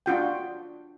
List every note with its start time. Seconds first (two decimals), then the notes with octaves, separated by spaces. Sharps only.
0.06 D4 F4 F#4 G5